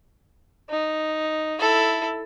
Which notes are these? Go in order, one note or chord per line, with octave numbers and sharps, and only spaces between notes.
D#4
E4 A4